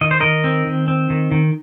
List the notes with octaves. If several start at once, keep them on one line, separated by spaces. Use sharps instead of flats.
D#3 D#5
C5
D#3 A#4 D#5
C4
D#3
C4
D#3
D#3